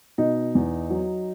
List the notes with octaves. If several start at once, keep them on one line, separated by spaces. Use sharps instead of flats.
B2 D#4
E2
F#3